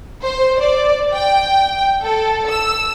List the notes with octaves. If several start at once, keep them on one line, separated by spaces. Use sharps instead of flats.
C5
D5
G5
A4
E6